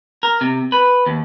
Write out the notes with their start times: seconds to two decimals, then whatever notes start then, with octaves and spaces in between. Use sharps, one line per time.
0.23 A#4
0.41 C3
0.72 B4
1.06 D#2